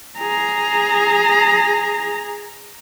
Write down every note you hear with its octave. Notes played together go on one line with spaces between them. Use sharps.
G#4 A#5